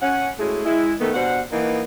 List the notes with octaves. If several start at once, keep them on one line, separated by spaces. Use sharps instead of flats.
C#4 F#5
G#3 A3 C#4 E4 F#4 G#4
G#3 E4
D#3 A3 B3
G2 B2 G3 C5 F#5
E3 A#3 B3 D#4